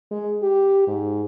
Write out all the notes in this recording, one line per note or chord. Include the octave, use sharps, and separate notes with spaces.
G#3
G4
G#2